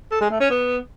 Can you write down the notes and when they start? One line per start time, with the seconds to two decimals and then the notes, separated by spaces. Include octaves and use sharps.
0.11 A4
0.21 G#3
0.30 A3
0.40 C#4
0.50 B3